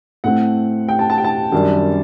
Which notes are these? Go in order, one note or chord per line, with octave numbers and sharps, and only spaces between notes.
A2 A3 C4 F#5
G5
A5
A5
G5
A5
F#2 D#3 G3 D4